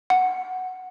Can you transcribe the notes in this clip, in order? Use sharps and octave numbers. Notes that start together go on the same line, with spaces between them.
F#5